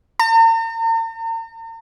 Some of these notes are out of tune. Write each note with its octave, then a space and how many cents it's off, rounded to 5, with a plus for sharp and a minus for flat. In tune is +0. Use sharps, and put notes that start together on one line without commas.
A#5 -45